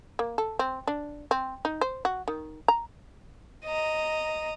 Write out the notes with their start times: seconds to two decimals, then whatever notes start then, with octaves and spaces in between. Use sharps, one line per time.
0.19 A#3
0.38 A4
0.59 C4
0.87 D4
1.31 C4
1.65 D#4
1.81 C5
2.05 F#4
2.28 D#3
2.68 A#5
3.65 D#5 A#5